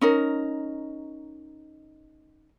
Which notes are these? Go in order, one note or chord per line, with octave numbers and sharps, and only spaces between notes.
C#4 D#4 A#4